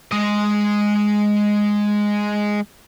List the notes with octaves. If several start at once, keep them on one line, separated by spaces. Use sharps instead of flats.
G#3 D#5